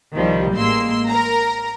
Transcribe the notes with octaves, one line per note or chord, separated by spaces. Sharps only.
C2 D#3 F3 G3
A1 G#3 A#3 C6 E6
A#4 A#5